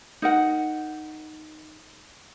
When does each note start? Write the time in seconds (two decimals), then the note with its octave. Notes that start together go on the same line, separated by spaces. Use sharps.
0.22 D#4 A#4 F#5